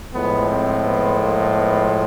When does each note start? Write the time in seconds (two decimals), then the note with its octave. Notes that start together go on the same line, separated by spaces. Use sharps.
0.13 A2 F3 G#3 B3
0.49 C4
0.85 B3
1.20 A#3
1.57 B3